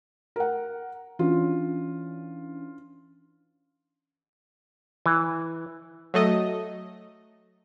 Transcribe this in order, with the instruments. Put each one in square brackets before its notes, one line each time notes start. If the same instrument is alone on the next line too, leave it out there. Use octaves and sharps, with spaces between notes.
[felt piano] A#4 F#5
[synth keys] E3 C#4 D4 [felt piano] F4
[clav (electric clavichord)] E3
[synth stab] F#3 A3 D#5